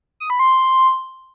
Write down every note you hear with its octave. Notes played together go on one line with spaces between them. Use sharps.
D#6
B5
C6